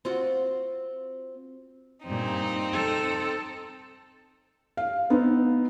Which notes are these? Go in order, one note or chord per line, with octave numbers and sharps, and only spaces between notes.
C4 F4 F#4
G2 A#2 C4 D#4
A4
F5
B3 C4 D#4 B4